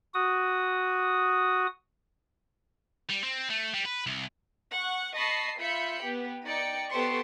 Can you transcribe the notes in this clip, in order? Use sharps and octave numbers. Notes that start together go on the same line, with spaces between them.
F#4 D#6
G3
C4
A3
G3
B4
C2
F#5 C#6
D#5 A5 B5 C#6 C7
F4 E5 B5 G6 C#7
B3 G4
D#4 D5 G5 C#7
B3 G4 A4 C5 C6 C#6